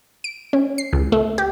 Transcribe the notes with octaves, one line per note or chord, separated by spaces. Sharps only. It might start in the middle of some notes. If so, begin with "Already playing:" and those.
D7
C#4
C7
C#2
A3
G4